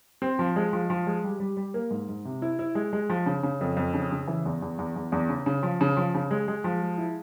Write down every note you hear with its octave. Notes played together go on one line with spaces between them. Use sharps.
C4
F3
G#3
F3
F3
G#3
G3
G3
G3
A#3
G#2
G#2
C3
E4
E4
G#3
G#3
F3
C#3
C#3
F2
F2
C#3
C#3
E3
E2
E2
E2
E2
E2
C#3
C#3
F3
C#3
F3
C#3
G#3
G#3
F3
G#3
E4